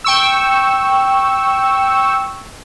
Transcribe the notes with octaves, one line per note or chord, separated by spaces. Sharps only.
G5 C#6 E6